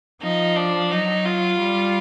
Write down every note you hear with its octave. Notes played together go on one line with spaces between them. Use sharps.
F3 D#4
D4
F#3 D#4
F4
G3